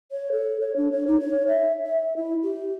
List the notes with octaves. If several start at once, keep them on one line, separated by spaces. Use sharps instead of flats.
C#5
A4
C#5
D4
C#5
D#4
C#5
E5
E5
E4
G4